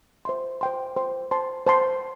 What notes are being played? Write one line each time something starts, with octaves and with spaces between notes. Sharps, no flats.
C5 E5 C6
C5 G5 C6
C5 G5 C6
C5 A5 C6
C5 A5 C6